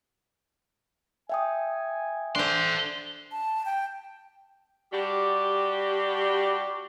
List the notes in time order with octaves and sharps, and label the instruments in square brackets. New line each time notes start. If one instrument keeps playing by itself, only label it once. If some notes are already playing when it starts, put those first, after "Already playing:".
[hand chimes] E5 G5 D#6 [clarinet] G#5
[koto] D4 C5 [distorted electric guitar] A4 C6
[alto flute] A5
G5
[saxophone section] G3 D4 F#4 G4